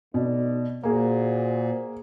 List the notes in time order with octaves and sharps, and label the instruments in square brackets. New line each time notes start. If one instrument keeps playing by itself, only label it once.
[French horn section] D2 D#4 D5 [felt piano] B2
[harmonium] A#2 [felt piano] A#3 G#4 [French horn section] F#4 C5